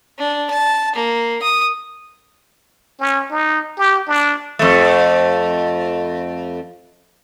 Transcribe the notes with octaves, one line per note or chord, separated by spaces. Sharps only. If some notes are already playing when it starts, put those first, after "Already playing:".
D4
A5
A#3
D#6
C#4
D#4
G4
D4
F2 A3